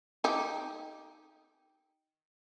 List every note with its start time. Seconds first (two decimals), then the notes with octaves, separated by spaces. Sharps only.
0.24 D#4 G4